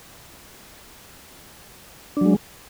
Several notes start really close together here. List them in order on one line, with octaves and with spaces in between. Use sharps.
D4 F#3 G#3